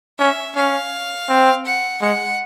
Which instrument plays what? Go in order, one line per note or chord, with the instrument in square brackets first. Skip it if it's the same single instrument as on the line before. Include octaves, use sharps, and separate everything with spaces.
[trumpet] C#4 [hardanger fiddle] E5
[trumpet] C#4 [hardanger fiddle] F5
[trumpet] C4
[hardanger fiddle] F#5
[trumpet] G#3 [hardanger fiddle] F#5